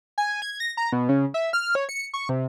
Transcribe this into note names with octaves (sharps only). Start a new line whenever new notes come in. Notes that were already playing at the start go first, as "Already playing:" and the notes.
G#5
G#6
A#6
A#5
B2
C#3
E5
F6
C#5
C#7
C#6
C3